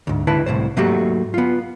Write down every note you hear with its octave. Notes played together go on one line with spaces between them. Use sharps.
D2 G#2
C#2 D3 E4 B4 A5
C2 A2 C3 C5
G#2 F#3 A3 A#3 F#4 G4
B3 F4